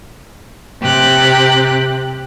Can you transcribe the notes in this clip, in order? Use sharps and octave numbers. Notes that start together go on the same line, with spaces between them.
C3 G4 F#6